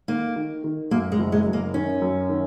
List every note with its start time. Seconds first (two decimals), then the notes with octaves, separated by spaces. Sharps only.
0.08 D#3 A#3
0.36 D#3
0.64 D#3
0.91 F#2 A#3
1.12 G#3
1.19 F#1
1.32 G#3
1.46 F#2
1.53 A#3
1.74 D#3 C#4
2.02 F#2
2.29 D#3